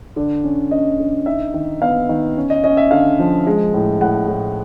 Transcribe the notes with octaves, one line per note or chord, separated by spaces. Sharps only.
D3 D5
C#4
C#4 D#5
D3
D#4 E5
D#3
B3 F5
D#3
C#4
D#5
C#4 D#5
E5
D3 F5
F3
G#3
A2
A2 F#5
A2